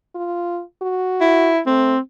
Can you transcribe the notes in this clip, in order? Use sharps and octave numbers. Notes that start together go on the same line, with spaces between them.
F4
F#4
E4
A3 C4